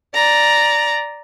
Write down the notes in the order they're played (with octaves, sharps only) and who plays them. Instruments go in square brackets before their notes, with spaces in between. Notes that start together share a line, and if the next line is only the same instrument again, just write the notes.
[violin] D5 A#5